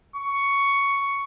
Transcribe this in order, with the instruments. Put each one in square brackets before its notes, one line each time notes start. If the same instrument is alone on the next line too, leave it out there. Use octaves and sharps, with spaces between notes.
[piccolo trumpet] C#6